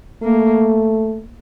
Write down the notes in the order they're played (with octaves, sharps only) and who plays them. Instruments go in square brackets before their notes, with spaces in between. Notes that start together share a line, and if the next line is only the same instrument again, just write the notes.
[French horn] A3 [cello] A#3